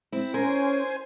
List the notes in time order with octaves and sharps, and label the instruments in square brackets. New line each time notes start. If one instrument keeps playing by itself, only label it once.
[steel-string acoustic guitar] C4 E4
[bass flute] C#4 [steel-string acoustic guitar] A#4 [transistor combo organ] C5 G#5